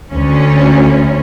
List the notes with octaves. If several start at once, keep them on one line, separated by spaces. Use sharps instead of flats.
D2 C#4